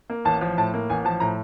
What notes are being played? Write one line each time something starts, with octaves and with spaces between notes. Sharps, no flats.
A#3
A1 A5
F3
A2 A5
A#3
A1 G#5
F3 A5
A2 A#5